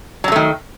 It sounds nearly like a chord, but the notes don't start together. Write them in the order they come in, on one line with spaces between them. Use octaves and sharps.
F#3 D3 A3 D#3